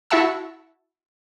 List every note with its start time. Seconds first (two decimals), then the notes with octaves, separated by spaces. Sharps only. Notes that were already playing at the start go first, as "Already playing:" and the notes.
0.10 E4 F#4 E5 F#5 A5 E6